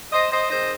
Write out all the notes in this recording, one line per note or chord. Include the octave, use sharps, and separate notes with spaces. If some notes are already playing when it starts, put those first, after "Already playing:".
C5 D#5
C5 D#5
D#3 G#3 C4 D#4 C5 D#5